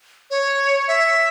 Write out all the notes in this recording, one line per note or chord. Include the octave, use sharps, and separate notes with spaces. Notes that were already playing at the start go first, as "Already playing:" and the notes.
C#5
E5